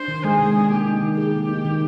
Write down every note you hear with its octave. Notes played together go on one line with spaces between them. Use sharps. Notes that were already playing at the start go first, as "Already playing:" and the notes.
Already playing: D4 C5
D#3
G#3 G#4
C3
D4
A#3 G4
D#4
D#3
G4 G#4
A#3
D#4
D#3